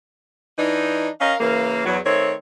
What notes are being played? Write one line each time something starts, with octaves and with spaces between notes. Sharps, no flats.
E3 D4 D#4
C#4 A#4 D#5 F5
C#3 E3 A#3
E2 F#3
D#3 A3 C4 C#5